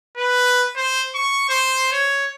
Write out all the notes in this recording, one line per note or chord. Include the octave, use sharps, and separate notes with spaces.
B4
C5
C#6
C5
C#5